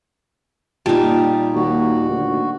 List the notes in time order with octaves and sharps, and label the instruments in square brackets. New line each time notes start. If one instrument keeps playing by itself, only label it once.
[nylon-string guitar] A#2 F4 A5 [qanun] G3 D#4
[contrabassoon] D#2 [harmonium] F#4
[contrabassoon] D2